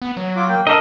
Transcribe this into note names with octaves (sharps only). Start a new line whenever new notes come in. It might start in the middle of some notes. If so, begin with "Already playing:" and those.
B3
F#3
F4 D6
A#3 G5
D4 A4 A#4 D#5